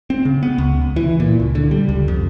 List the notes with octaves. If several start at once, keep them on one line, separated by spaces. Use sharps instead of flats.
C4
C#3
B3
C#2
C#2
E3
A#2
C#2
D3
G3
C#2
F2